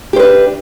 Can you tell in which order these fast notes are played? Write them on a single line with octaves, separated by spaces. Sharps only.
G4 C5 B4 D4